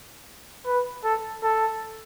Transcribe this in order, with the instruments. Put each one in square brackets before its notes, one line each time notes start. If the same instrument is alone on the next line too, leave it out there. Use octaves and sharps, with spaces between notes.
[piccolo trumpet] B4
A4
A4